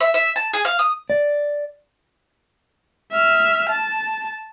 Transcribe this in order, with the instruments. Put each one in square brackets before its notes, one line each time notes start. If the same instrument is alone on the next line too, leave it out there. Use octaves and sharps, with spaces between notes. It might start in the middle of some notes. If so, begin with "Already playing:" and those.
[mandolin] E5
E5
A5
G#4
F5
D#6
[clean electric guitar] D5
[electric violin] E5 F6
A5